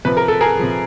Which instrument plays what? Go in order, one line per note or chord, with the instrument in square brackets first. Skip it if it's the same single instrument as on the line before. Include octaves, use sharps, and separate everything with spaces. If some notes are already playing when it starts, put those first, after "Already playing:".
[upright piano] C3 F3 B4
A#4
A4
G#4 A#4
C3 F3